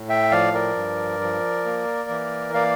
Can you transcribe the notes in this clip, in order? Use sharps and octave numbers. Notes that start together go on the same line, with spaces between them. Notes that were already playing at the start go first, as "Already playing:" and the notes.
Already playing: A2
E5 G5
F3 D5 F5
A#4 D5
G2
F3
A#3
E3
A#3 D5 F5